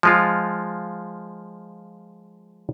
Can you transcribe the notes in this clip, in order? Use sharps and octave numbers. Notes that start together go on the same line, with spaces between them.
F3 G#3 F4